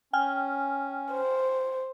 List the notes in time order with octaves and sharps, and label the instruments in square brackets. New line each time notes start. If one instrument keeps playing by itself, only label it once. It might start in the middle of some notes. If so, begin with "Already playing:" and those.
[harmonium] C#4 [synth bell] G5 G#5 F6
[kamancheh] C5